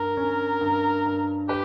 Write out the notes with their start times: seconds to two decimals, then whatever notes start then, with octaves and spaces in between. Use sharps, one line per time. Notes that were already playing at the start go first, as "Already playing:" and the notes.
Already playing: G2 A#4
0.17 C#4
0.61 G2
1.06 G2
1.49 G4 B4